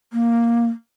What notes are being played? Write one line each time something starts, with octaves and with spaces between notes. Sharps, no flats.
A#3